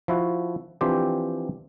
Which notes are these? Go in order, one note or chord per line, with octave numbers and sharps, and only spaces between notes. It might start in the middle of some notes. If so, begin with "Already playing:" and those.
F3 E4 F#4
E3 F3 C4 D4 G4 C5